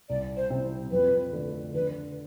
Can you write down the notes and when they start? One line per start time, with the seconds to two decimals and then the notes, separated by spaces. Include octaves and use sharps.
0.09 C2 D5
0.37 C5
0.50 C3 G3 C4 E4
0.92 F2 B4
1.33 D3 A3 D4
1.74 D3 B4